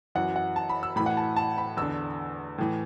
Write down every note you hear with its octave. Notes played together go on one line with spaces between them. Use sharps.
F#2 E3 F#5
F#5
A5
B5
E6
A2 E3 B5
F#5
A5
A5
B5
E2 D3 E6
A2 E3